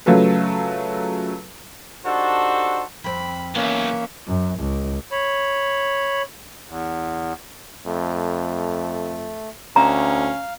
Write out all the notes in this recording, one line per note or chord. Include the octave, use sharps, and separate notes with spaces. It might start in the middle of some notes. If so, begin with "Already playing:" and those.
C#3 F#3 A3 F4 A4 B4
D4 D#4 F#4 G4 A4 C5
F2 C4 B5
B1 E3 A#3 C#4 E5
F#2
C#2
C#5 B5
E2
F2 A3
D2 C#4 F5 A#5